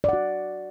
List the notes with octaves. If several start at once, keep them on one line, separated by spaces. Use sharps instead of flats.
F#4 D5 F#5